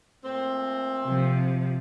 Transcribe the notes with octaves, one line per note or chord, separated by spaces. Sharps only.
A#2 A3 C4
C3 F3